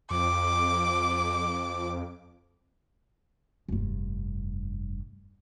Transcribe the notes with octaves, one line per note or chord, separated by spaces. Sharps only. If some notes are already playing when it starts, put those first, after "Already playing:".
F2 D6
F1 G2